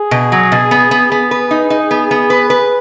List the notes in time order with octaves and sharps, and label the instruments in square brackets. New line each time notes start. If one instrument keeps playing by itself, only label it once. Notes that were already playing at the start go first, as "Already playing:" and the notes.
Already playing: [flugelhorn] G#4
[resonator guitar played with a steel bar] B2
F#3
B2
B3
B3
[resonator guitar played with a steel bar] B3 [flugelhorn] G#4
[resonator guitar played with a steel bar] B4
D#4
D#4
B3
B3
B4
B4